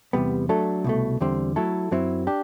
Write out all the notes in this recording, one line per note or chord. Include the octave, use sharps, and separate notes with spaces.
E2 C3 G3 B3
F#3 A3 D4 A4
C2 B2 A3
E2 D3 G3 C4
F#3 A3 E4 A4
F#2 F#3 C4 E4
D4 G4